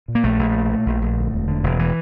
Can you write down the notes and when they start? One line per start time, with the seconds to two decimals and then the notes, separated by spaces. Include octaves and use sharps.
0.08 A#2
0.15 A#3
0.24 A#1 A3
0.39 A#1
0.55 A#2
0.70 A#2
0.86 A#1
1.02 A#1
1.17 D2
1.32 E1
1.48 D3
1.63 E1
1.79 E3